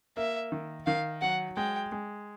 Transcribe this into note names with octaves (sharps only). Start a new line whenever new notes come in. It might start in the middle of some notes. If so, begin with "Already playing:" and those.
A#3 E5
D#3
D#3 F5
F#3 F#5
G#3 G5
G#3